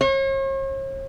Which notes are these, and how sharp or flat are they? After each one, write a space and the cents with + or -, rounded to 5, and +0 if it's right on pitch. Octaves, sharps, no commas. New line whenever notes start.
C#5 -45